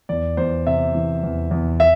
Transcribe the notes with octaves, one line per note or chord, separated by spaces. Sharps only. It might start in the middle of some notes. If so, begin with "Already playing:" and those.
E2 D5
E2 C5
C3 E5
E3
E2
E2
E5